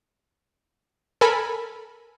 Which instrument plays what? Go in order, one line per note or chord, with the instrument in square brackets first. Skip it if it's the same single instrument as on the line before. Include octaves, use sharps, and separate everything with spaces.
[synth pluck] A4 A#4 G#5 B5